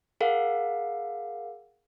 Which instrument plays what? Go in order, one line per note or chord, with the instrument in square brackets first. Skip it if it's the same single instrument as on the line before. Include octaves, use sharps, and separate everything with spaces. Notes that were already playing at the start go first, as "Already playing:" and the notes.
[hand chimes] G#4 A#4 F5 F#5